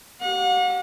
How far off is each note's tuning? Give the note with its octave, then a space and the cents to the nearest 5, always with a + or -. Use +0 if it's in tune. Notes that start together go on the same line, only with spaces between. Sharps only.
G4 -40 F#5 -40